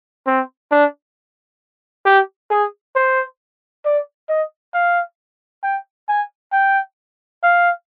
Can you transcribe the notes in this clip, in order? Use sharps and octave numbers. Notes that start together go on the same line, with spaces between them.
C4
D4
G4
G#4
C5
D5
D#5
F5
G5
G#5
G5
F5